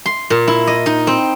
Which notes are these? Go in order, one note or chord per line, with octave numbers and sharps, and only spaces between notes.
C6
A#2
E4
D#5
D#4
C4